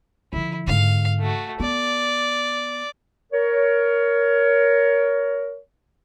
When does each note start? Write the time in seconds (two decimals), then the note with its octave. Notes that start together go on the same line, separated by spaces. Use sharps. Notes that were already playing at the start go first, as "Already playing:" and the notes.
0.33 D3 F3 E4
0.67 G#2 D3 F5
1.20 A3 F#4
1.60 B3 D5
3.33 A#4 C#5